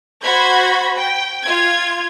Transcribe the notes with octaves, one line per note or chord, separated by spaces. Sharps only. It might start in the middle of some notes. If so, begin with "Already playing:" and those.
F#4 C5 B5 G#6
G5
F4 G#6